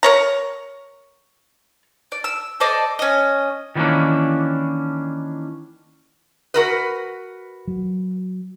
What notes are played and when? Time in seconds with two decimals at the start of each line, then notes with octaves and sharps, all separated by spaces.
0.03 A#4 C#5 A#5
2.12 D5
2.24 E6
2.60 A4 C5 D5 D#5
2.99 C#4 D#5
3.75 D#3 E3 G3 A#3 C#4 D4
6.54 F#4 A#4 B4
7.68 F#3